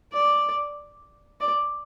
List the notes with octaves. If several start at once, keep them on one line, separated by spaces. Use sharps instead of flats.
D5
D5